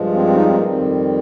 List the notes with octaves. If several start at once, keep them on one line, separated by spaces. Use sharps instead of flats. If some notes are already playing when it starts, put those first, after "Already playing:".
Already playing: G2 F3 G#3
C4
C4
D#4
C4
A#3
F2 D#3 G3 C4